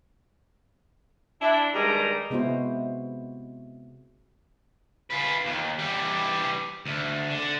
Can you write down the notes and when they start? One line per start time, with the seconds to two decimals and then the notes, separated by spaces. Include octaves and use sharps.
1.41 D4 E4
1.74 G2 D#3 G3 G#3 A#5
2.30 C3 G#3 B3 E4 F#4 C5
5.11 F4 B4
5.45 D#2
5.79 E3 G3
6.85 D2
7.29 D3